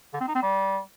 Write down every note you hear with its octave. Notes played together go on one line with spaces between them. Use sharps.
D3
C4
D#4
C4
G3